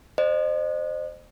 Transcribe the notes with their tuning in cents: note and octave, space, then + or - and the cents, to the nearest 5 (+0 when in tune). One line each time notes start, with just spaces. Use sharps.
C5 +0 D#5 -40